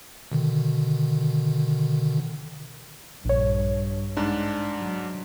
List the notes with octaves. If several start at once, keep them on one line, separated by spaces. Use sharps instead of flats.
B2 D3 D#3
A#1 G2 C#5
G#2 D4
F#3